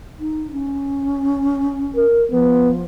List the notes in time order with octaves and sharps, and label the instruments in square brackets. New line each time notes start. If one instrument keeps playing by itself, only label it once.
[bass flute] D#4
C#4
[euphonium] A#4
[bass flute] F3 [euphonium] B3